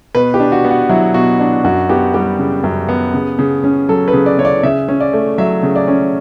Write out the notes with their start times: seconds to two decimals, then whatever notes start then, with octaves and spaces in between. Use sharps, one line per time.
0.15 B2 B4
0.34 G4
0.40 D4
0.52 F#4
0.65 B3
0.71 F#4
0.89 F#3 E4
1.14 B2 F#4
1.40 D4
1.64 F#2 F#4
1.89 B3 G4
2.14 G3 G4
2.39 C#3
2.64 F#2
2.89 B3
3.14 C#3
3.39 C#3
3.64 C#4
3.89 F#3 A4
4.08 B4
4.13 C#3
4.26 D5
4.39 C#3 C#5
4.45 D5
4.63 C#3 E5
4.88 C#4
5.01 D5
5.13 A3
5.38 F#3 E5
5.63 C#3
5.76 D5
5.88 C#4